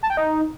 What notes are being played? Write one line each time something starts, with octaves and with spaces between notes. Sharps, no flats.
A5
G5
D#4